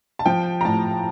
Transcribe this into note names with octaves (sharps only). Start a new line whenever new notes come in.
A5
F3 G5
A#5
A2 A5